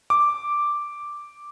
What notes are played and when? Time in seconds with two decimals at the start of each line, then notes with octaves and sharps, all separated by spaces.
0.10 D6